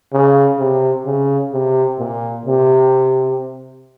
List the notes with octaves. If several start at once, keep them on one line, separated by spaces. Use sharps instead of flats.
C#3
C3
C#3
C3
A#2
C3